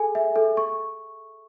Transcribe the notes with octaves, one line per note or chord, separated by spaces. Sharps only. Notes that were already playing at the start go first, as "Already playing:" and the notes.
Already playing: G#4 A4 G#5
E5
A4
C#6